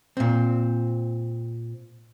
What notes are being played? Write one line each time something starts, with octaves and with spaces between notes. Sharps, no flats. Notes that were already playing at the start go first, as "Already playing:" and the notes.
A#2 C4